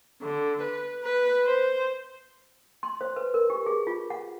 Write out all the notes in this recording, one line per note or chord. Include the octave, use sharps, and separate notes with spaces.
D3
B4
B4
C5
C6
C5
B4
A#4
G4
G#4
F4
F#5